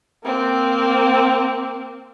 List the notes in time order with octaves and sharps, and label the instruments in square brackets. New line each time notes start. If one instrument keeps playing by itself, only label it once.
[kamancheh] A#3 C4